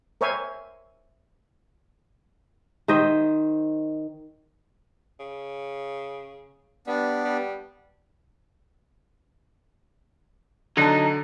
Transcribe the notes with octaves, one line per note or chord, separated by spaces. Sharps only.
A#4 C5 C#5 E5 G#5
D#3 C5 D#5 E5
C#3
G3 B3 D4
G3
D3 F#3 D#4 A5